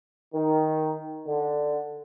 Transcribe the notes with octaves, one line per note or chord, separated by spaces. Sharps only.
D#3
D3